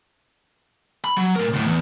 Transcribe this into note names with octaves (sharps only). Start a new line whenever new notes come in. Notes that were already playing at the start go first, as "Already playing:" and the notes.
B5
F#3
A2 A#4
D2 A2
E2